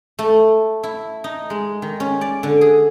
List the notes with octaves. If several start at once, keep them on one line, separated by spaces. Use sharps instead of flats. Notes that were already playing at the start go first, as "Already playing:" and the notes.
A3
E4
D#4
G#3
D#3
C#4
D5
D3
G#4